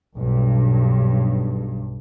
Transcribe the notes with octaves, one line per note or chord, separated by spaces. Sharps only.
B1 G2